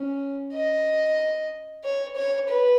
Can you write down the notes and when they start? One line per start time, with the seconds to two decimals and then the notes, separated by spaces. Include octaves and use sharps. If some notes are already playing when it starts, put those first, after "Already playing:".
Already playing: C#4
0.54 D#5
1.84 C#5
2.16 C#5
2.48 B4